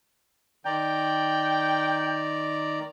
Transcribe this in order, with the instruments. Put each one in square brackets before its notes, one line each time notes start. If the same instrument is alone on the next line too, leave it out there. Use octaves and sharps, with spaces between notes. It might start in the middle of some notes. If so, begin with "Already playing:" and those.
[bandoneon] D#3 D5 A#5 [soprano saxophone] G5